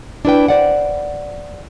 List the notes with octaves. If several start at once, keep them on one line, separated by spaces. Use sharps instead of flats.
D4 E4 B4 G5
C5 D5 F#5